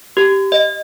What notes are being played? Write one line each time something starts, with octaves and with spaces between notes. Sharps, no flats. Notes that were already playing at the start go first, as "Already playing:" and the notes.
G4
D#5